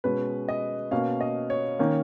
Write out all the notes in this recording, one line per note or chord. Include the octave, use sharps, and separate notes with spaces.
B2 G#3 C#4 B4
D#5
B2 A#3 C#4 F5
D#5
C#5
D#3 A#3 C#4